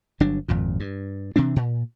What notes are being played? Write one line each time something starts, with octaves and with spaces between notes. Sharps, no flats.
G1 F#3 D4
G#1 F2 A#2
G2
C3 E3 C4 D4
A#2